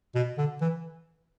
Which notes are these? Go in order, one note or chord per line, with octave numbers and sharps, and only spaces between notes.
B2
D3
E3